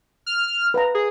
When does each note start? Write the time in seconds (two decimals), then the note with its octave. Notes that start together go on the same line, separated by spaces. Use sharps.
0.26 F6
0.74 B4 F5 A#5
0.95 G#4